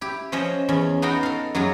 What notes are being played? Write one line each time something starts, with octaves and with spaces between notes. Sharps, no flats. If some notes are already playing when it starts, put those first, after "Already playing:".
E4 G4
F3 C#4 C5 C#5 D#5
E2 C#4
B3 D#4 F#4 F5 G5
A4 F5
F#2 F#3 F4 G#4 A#5